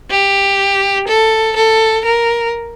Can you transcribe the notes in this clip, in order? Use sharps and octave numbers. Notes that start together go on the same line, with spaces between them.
G4
A4
A4
A#4